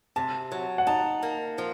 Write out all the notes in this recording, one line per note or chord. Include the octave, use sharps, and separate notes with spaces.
C3 A5
F#3
F#5
D#4 A5
A#3
F3